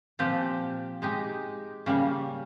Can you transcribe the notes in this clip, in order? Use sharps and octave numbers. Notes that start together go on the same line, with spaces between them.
A#2 F3 C4 G4
G#3 D#4 G4
C#3 G3 A#3